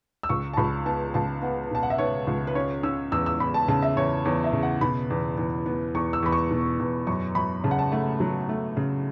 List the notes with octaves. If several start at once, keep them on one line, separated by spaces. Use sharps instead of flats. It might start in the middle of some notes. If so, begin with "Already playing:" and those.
E6
C#2 C#6
A5
C#2 B5
B3 A5
C#2 A5
B3 F#5
B2 A5
F#5
E5
B3 C#5
C#2
B4
C#4 C#5
C#4 E6
E2 E6
E6
E2 B5
A5
C#3 A5
E5
E2 C#5
E2 C#5
E5
C#3
F#5
B2 B5
E2
E2
B3
E2 C#6
E6
E2 B5
C#6
B2
E2
F#2 C#6
F#2 B5
C#3 A5
F#5
A5
A3 F#5
F#3
A3
C#3